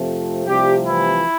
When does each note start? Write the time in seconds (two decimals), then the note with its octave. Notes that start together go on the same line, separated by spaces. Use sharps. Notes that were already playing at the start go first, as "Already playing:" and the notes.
Already playing: F2 C3 F3 A3
0.47 C2 C3 F3 G3 A3 G4
0.86 E3 E4